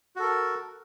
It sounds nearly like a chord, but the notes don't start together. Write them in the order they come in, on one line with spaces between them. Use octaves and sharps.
F#4 A4 A#4